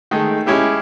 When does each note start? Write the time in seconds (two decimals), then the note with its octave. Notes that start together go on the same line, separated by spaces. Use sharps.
0.11 D#3 G#3 A3
0.46 G#3 C#4 E4 G4 E5